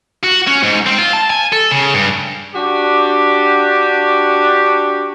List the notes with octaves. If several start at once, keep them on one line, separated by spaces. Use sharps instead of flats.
F#4
C#4
G#2
C4
F4
A5
G#5
A4
C#3
G2
D4 F#4 G4